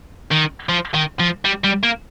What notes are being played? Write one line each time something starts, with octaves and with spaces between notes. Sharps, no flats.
D#3
F3
D#3
F3
G3
G3
A#3